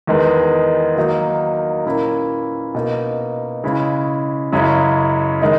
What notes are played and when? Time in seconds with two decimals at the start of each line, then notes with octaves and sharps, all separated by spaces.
0.07 E2 D#3 G#3 B3
0.96 D#3 F#3 A#3 D#4
1.86 A#2 A#3 C#4 E4
2.75 B2 A#3 D#4
3.64 C#3 G#3 C#4 E4
4.52 F#2 C#3 G#3 C#4 E4
5.41 D#3 G#3 D#4